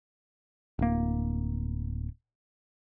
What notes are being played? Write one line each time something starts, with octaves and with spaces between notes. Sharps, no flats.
D1 A#3